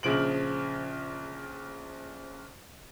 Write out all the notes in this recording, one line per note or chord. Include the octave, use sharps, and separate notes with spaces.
A#1 C#3 F3 D7 F#7